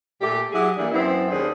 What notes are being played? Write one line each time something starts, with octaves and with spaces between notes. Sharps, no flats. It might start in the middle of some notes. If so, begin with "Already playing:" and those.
A#2 A3 G4
F#3 E4 G4 G#4
E3 G3 A3 A#3 D4
F#2 B3 C4 E4
D#2 C#4 D4 G#4 C5